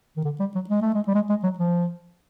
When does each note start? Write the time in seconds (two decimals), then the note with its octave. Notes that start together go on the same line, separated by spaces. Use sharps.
0.17 D#3
0.24 D3
0.40 G3
0.55 F#3
0.69 G#3
0.82 A3
0.95 G#3
1.07 G3
1.15 G#3
1.30 G#3
1.43 F#3
1.59 F3